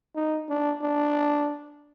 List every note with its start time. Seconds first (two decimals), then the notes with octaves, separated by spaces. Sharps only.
0.15 D#4
0.49 D4
0.82 D4